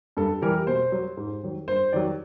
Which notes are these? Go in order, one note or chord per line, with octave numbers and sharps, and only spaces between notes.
G2 A4
E3 G3 A#4
B2 C5
F#3
G#2
D#3 F#3
G2 C5
D#3 F#3 D5